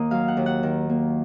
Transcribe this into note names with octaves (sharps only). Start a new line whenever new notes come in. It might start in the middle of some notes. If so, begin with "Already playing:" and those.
Already playing: D#2 D#3 A#3 D#5
F#3 F5
F#5
D#2
F#5
D#3
A#3